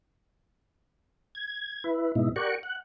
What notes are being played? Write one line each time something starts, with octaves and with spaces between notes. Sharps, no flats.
G#6
E4 B4
G#2 B2 D#4 E4
G4 A#4 D5 F#5 C#6
F#5